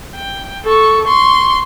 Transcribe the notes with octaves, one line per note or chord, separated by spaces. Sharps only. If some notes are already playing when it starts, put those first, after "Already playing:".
G5
A4 C#6
C6 C#6